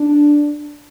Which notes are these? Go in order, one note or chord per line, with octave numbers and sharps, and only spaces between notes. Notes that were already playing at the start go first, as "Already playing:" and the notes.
Already playing: D4